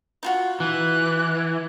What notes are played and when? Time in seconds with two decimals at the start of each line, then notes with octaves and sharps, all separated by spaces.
0.23 D#4 F4 F#4
0.60 E3 F#6